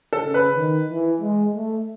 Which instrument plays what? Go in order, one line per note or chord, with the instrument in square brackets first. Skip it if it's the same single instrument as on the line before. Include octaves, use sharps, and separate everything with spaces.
[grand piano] A4
[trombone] C#3
[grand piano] B4
[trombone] D#3
E3
G#3
A3